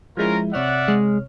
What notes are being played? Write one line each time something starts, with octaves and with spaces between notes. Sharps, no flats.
F3 G#3 C#4 E4 F4 A#4
C3 C#5 D5 E5 F#5 F6
G#3